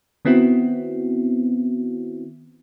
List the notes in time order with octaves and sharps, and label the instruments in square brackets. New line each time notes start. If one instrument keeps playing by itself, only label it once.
[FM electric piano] D#3 B3 C4 E4 F#4